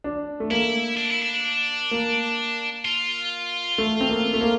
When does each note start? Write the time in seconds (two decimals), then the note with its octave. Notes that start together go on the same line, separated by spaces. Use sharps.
0.04 D4
0.40 A3
0.51 A#3 E4
0.97 D4
1.10 E4
1.22 D4
1.91 A#3
2.85 F4
3.78 A3
4.01 C4
4.09 A#3
4.33 A3
4.41 A#3